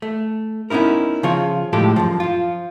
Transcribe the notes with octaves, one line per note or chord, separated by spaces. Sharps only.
A3
B3 C#4 D#4 E4 A#4
C#3 F3 F4 C#5
A2 F3 G#3 G4 A4
F#2 B2 F3
F3 F4